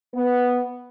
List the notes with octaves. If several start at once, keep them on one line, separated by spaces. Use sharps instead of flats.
B3